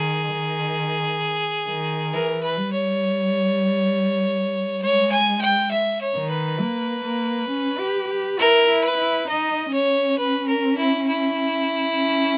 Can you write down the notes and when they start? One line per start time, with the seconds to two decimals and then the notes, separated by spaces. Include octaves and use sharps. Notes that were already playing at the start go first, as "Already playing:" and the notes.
Already playing: D#3 G#4
0.34 D#3
1.68 D#3
2.13 E3 A#4
2.43 B4
2.57 G3
2.73 C#5
4.82 G#3 C#5
5.11 G#5
5.41 G5
5.71 E5
6.01 C#5
6.15 D#3
6.30 B4
6.60 A#3
7.05 A#3
7.50 C#4
7.79 G4
8.09 G4
8.39 E4 A#4
8.68 E4
8.84 B4
8.98 E4
9.29 D#4 D#5
9.73 C#4 C#5
10.18 B4
10.48 A#4
10.78 E4
11.07 E4
11.97 C#4